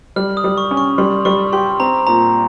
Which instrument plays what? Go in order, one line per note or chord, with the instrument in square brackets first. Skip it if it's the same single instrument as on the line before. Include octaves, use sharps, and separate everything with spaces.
[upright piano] G3 [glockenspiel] F6
[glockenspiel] D#6
[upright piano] G3
[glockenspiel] C#6
[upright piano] C#4
[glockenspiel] C#6
[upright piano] G3 [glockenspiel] C6
[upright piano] G3 [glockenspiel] C#6
[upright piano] G4 [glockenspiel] C6
[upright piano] C4 [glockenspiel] A#5
[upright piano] A#2 [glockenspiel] A#5